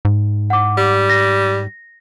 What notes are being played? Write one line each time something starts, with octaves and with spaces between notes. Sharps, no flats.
G#2
F#5 D6
G3
A#6